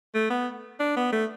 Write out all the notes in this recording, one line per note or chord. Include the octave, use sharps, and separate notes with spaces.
A3
B3
D4
B3
A3